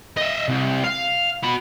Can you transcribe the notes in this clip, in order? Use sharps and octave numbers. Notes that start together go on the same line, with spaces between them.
D#5 E5
C2
F5
F#4 B5